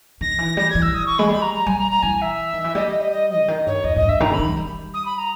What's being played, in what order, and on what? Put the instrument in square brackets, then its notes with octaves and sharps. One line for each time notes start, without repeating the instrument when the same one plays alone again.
[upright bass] D#3 [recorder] A#6
[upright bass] E3
[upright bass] G3 [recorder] A#6
[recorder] G#6
[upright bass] E3
[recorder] E6
D#6
C#6
[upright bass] G#3 [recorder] B5
[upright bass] G3 [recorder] B5
[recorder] A#5
A#5
[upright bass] G3 [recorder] G#5
[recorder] A#5
A#5
[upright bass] E3 [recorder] G#5
[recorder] E5
[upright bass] D#3
E3
[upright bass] G3 [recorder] D#5
[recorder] D#5
D#5
D#5
D#5
[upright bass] C#3
D#3
[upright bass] G2 [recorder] C#5
[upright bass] E2 [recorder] D#5
[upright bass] G#2 [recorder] D#5
[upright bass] G2
[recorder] E5
[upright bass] D#3 [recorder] A#5
[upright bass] C#3 [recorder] B5
[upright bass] D#3
G#3
G3
[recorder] D#6
B5
A#5